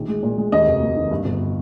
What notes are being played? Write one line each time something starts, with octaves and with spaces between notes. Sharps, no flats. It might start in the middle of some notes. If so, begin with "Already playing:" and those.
Already playing: A#1 D#3
G#3
A#2
G#3
D#2 D#5
F1
A#3
D#3
G2
G1